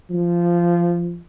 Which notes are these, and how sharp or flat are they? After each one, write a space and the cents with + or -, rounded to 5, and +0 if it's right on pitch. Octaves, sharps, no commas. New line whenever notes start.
F3 -15